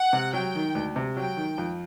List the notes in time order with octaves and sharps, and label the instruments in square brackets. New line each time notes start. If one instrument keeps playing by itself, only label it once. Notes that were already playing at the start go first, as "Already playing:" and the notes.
Already playing: [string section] F#5
[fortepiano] C3
[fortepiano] F#3 [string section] G5
[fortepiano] D#3
D2
C3
[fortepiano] F#3 [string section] G5
[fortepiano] D#3
F2